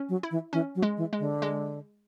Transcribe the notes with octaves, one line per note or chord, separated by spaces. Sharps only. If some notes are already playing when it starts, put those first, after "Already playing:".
Already playing: C#4
F#3
E4
E3
E3 C#4
F#3
G#3
E3
G#3
D3
G#3